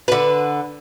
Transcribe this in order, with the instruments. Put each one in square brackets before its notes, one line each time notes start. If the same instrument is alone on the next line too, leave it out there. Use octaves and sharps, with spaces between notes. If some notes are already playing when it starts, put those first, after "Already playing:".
[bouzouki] D3 B4